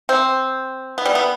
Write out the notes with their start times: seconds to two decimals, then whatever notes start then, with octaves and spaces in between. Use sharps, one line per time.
0.09 C4
0.98 B3
1.05 G3
1.15 B3